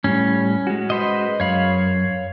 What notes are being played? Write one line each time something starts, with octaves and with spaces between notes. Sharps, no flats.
A2 G3 C#4
G#3 F#4
B4 C5 D#5
F#2 C#5 F5 B5